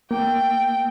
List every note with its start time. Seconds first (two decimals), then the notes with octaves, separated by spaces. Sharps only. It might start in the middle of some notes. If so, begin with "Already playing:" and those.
0.11 A#3 G5